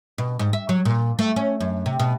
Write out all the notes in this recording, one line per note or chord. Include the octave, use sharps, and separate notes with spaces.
B2
G#2
E5
F#3
A#2
A3
C#4
F#2
C3
B2